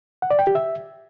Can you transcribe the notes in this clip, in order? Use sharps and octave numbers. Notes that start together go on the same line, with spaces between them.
F#5
D5
G5
G4
E5